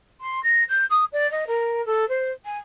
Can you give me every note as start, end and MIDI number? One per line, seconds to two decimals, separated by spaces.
0.20 0.39 84
0.43 0.63 94
0.68 0.84 91
0.90 1.04 87
1.12 1.29 74
1.31 1.44 75
1.47 1.84 70
1.85 2.07 69
2.08 2.31 72
2.44 2.57 80